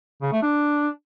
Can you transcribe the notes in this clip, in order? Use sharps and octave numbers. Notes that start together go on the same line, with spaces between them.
C#3
A3
D4